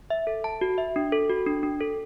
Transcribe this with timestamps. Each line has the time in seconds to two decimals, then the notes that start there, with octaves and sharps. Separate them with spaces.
0.10 E5
0.27 A4
0.44 A5
0.61 F#4
0.78 E5
0.96 D4
1.12 A4
1.30 F#4
1.46 D4
1.63 D4
1.80 A4